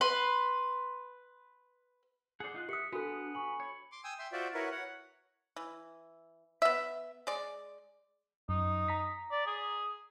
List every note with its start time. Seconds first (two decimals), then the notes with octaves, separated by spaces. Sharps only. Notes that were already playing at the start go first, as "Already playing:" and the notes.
0.01 B4 C6
2.40 G#4 C5 D5 F#5
2.54 D#4 F4 F#6
2.69 G4 E5 D#6 B6 C#7
2.93 B3 D4 F#4 A4 G#5 D#6 F#6
3.35 G#5 B5 C#6
3.60 C#5
3.92 C6 D6
4.04 G5 G#5 D#6 E6
4.19 E5 G5 C6
4.32 F4 F#4 C5 D5 E5
4.54 E4 F#4 A#4 B4 C#5
4.71 C#5 F#5
5.56 E3
6.62 B3 E5
7.27 G#3 D5
8.49 F#2 D#4
8.88 A#5 B6
9.31 D5
9.46 G#4